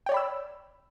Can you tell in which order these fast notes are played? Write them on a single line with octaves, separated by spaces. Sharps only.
G5 C#5 D5 B5 E6